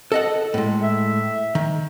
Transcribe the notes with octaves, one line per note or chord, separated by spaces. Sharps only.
A4 D#5 F#5
A2 G#3
E5
D#3